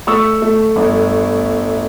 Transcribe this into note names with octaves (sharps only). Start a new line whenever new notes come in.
A3 C#6 E6
A3
G1